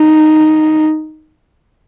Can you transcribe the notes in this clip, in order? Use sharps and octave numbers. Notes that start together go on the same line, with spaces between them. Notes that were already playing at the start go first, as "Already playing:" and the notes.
Already playing: D#4